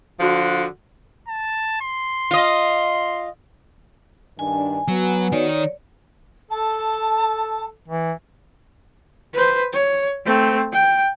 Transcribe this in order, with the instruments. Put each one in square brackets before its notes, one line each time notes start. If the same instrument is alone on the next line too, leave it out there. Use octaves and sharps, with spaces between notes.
[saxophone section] D3 F3 F#4
[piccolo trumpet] A5
C6
[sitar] F4 D#5
[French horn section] G2 D#3 D4 [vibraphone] G#5
[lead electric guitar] F#3 [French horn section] B3 F#4
[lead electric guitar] D#3 D#4 [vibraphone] C#5 D5
[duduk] A4 [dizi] A5
[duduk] E3
[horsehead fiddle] B4 C5
C#5
A3 C4
G5